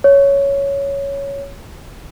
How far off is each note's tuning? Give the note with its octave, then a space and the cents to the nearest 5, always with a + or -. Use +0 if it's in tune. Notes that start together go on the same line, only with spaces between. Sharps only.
C#5 +5